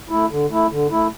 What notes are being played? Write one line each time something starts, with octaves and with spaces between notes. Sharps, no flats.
A3 E4
D3
A3 E4
D3
A3 E4